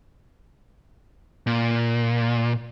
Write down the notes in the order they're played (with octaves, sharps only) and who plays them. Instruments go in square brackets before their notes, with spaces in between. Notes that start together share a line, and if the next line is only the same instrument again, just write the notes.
[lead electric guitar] A#2